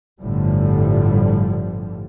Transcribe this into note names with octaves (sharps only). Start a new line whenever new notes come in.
G1 A2 D3 F3 G3